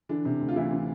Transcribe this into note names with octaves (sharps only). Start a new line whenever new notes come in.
D3 E3 D4
C3
D2
F4
D2 E3 E4
E3